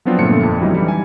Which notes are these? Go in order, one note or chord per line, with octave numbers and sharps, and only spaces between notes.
F3 F#3 B3 C4 D4 F4
G1 A#2 A3 B3 C#7
F2
D3 E3 F#3 G3 D#4
E3 G3 E4
G#5